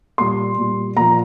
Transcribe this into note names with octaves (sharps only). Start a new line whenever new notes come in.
A#2 G3 C6
A#2 G3
A#2 F3 A#5